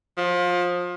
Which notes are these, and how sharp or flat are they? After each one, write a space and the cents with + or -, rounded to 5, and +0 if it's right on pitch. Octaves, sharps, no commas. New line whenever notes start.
F3 +25